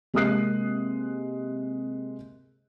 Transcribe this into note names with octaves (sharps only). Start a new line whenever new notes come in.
C3 G#3 A#3 D#6 F#6 C7